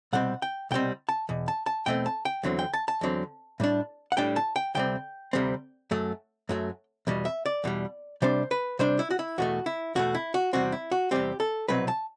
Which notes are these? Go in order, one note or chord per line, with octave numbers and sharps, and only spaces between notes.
C2 B2 G3 C4 F#5
G5
C2 B2 G3 C4 G5
A5
E2 B2
A5
A5
E2 B2 A3 C4 G5
A5
G5
E2 D3 F#3 C4
G5
A5
A5
E2 D3 F#3 C4
A2 G3 D4
F#5
A2 G3 D4 G5
A5
G5
D2 C3 G3 C4 G5
D2 C3 G3 C4
F#2 F#3 A3
F#2 F#3 A3
E2 B2 G3
E5
D5
E2 B2 G3
C3 G3 D4 C5
B4
C3 G3 D4 C5
E4
F#4
E4
E2 B2 A3 F#4
E4
E2 B2 A3 F#4
E4
F#4
E2 C3 G3 C4 F#4
E4
F#4
E2 C3 G3 C4 G4
A4
C2 B2 F#3 C4 B4
A5